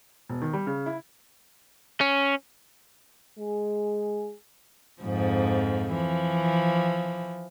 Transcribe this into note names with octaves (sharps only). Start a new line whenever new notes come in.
E1
D#3
G3
C#3
E4
C#4
G#3 G#4
F2 G#2 F3
E3 F3